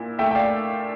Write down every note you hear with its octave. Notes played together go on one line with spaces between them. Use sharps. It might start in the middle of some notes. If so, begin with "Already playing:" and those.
Already playing: A#2 E4
A3 E5 G5
G5
D5 F5